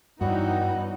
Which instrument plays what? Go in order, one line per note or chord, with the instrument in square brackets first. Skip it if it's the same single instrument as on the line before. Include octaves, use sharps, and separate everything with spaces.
[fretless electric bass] G2 [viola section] E3 D#4 [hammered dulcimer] F#3 G3 B3 [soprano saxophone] F#4